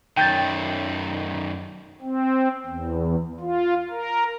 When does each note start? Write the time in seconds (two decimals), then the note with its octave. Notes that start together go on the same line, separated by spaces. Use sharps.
0.17 F#2 D#3 G5 G6 A6
2.01 C4
2.66 E2
3.40 F4
3.91 A#4